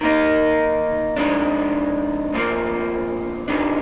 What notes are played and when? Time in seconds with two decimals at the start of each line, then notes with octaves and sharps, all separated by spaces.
0.01 D#3 A#3 D#4
1.16 F2 D#3 G#3 D4
2.32 C2 A#2 F3 A#3
3.48 G2 D#3 G3 D4